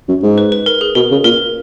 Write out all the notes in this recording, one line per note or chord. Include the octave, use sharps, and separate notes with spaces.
F#2
G#2
B4
B4
A#4
G#4
B2 A#4
C#3
A#2 A#4